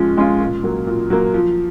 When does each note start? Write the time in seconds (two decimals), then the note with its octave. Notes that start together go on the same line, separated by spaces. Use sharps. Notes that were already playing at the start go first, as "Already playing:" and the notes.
Already playing: F3 G#3 C#4 F4
0.17 G#3 C#4 F4
0.40 A#2
0.63 F#3 A#3
0.87 A#2
1.10 F#3 A#3
1.34 F3